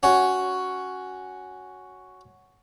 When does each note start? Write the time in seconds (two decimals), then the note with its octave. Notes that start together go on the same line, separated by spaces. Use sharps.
0.03 C#4 F#4